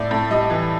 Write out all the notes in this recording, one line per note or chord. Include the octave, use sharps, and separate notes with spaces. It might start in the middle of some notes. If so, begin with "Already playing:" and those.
Already playing: A2 D5
A2
G3 D#5
E3